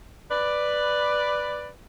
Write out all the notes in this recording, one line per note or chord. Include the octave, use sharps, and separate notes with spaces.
B4 D5